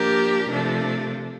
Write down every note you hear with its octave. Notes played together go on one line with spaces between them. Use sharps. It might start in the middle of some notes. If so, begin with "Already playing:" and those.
Already playing: F3 A#3 D4 G4 A#4
C3 F3 A3 D4